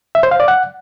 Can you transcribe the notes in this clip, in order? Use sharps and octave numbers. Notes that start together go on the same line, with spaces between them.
E5
C5
F5
D5
F#5